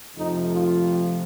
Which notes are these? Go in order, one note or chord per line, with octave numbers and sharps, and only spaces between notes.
F2 C3 F3 A3 D#4
F4